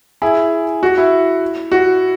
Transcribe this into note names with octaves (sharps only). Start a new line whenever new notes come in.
E4 G#4
F#4
E4
F#4